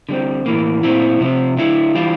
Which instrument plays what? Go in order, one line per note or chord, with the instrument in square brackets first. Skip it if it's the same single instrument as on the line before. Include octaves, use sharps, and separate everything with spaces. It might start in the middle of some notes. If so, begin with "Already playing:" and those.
[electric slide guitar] D3 G3 C4
A2 E3 A#3
A#2 A3 C4 E4
C3 F3 C4
D3 A3 E4
E3 G3 D4 F4